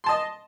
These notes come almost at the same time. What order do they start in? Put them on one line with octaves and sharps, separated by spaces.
C6 A5 D#5